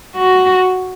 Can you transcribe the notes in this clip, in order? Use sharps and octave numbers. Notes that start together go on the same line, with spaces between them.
F#4